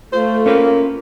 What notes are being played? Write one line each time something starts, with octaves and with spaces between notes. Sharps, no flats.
A3 F4 C5
A#3 C#4 B4